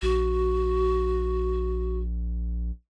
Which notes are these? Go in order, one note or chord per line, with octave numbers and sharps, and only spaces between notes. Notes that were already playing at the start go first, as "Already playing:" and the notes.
A#1 F#4